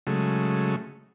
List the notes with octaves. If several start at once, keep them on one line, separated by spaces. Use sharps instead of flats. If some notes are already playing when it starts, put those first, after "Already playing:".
C#3 F#3 G#3 A3